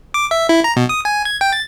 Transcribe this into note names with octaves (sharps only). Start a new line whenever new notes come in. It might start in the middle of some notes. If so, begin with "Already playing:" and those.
D6
E5
E4
A#5
B2
D#6
G#5
G#6
G5
A6